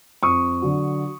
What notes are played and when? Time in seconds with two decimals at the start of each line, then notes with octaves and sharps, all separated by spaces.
0.23 F2 C#6 D#6
0.62 D3 F#3